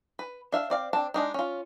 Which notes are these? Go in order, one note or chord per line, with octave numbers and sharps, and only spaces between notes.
B4
D4 E5 F5
C4 D5 F5
C4 D4 A5
G#3 D4 D#4
C#4 F4